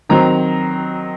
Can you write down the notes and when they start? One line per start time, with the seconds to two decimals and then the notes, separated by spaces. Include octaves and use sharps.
0.09 D#3 F#3 C4 A#5